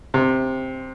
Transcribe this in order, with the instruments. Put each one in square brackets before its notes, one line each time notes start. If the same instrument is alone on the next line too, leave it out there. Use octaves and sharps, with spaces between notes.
[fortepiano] C3